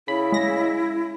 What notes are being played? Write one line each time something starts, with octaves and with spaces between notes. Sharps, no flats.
C#3 E4 B5
G#3 A#6